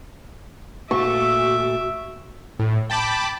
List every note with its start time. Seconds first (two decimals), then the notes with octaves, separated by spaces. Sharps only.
0.91 A#2 A3 F#4 E5 C#6 D6
2.59 A2
2.90 G5 A5 B5 D6